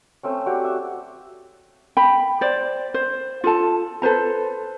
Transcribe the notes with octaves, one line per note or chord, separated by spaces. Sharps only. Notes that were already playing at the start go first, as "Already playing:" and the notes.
A3 C4 C#4
F#4 G4 D5
E5
G5 B5
C5 D5
C5
F4 A4 A5
A4 B4 C5 A#5